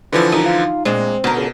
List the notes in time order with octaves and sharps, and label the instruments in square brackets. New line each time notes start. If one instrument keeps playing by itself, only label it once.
[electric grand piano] D3 E3 F3 [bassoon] B4
[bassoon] C2 [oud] D#4
[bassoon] F4
[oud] A#2 D4 [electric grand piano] G#3 [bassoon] C4
[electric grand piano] B2 [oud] D3 A#4
[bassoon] C#2